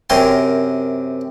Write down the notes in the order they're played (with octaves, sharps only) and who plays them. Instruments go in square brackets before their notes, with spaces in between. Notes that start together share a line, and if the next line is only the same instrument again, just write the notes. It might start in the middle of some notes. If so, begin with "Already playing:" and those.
[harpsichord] F#2 C3 C4 A#4 G#5 C6